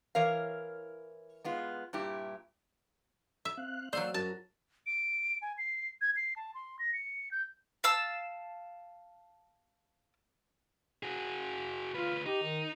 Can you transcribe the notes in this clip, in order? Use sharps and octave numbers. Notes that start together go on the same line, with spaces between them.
E3 A#4 C#5 F5
G#3 B3 F4
G2 A#2 E4 G4
E5
C4 F5 F#6
F#3 A#3 C5 D5 F5 G5 E6
F#2 F#4 A5 A#5
D7
G#5
C7
G#6
C7
A5
C6
A#6
C#7
G6
F5 A5 E6
F#4 G#4
D2 F4 B4
D#4 G4
D#3